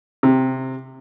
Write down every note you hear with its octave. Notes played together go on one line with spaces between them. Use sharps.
C3